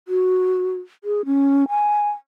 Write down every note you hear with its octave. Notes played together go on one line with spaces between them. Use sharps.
F#4
G#4
C#4
G#5